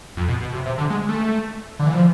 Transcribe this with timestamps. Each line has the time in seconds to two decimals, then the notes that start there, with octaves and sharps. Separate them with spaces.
0.17 F2
0.29 B2
0.41 B2
0.53 C3
0.65 C3
0.78 D3
0.90 G#3
1.09 A3
1.80 D3
1.87 E3
1.94 F3